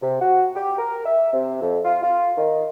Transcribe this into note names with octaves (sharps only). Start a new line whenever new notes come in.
C3
F#4
G4
A#4
E5
C3
F2
F4
F4
D#3